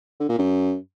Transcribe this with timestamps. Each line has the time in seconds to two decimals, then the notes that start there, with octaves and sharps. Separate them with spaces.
0.20 D3
0.29 A#2
0.39 F#2